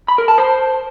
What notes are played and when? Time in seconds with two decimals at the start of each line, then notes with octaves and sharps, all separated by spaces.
0.08 B5
0.18 A#4
0.28 A5
0.38 C5